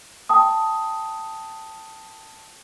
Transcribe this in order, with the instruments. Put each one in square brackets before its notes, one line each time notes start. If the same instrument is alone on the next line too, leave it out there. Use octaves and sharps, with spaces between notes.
[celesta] G5 A5 D#6